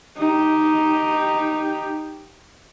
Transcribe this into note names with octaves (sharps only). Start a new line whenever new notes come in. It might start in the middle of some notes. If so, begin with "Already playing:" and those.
D#4 G4